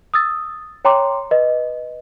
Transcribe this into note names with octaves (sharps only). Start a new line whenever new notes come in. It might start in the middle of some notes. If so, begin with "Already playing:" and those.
D#6 E6 A6
C#5 G5 A#5 C6 D6
B4 D#5